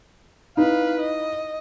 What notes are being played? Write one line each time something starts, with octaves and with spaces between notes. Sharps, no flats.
D#4 E4 B4 F5
D#5